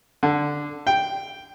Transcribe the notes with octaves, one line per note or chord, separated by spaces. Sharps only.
D3
G5